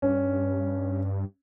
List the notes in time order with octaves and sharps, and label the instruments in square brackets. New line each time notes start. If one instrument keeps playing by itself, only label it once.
[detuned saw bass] G2 [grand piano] C#4